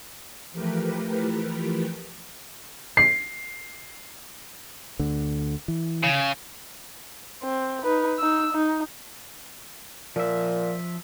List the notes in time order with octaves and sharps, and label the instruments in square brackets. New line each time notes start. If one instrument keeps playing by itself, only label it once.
[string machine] E3 F3 A3 G4 A#4 B4
[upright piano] C7
[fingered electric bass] D2 D3
E3
[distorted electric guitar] C#3
[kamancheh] C4
D#4 B4
D#4 E6
D#4
[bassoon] A#2 [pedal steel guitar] F3 E5